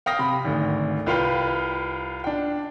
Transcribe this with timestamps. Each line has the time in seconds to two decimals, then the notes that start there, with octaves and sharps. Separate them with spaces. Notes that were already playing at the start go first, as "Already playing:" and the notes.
0.06 F5 G5 D#6 A#6
0.19 C3 B5
0.45 G#1 D2
1.06 C2 F4 B4 F5 G5
2.24 D4 G5